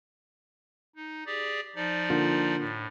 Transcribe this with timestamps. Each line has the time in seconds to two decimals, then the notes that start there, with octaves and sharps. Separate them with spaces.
0.96 D#4
1.26 G4 G#4 D5
1.76 F3 D#4 D5
2.10 D3 A#3 F4
2.57 A2